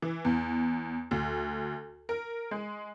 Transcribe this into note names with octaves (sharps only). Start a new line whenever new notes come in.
E3
E2
D2
A#4
G#3